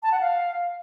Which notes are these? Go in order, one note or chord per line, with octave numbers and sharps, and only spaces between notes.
A5
F#5
F5